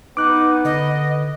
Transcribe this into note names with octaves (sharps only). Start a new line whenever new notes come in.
B3 D#4 D6 F#6
D3 D#5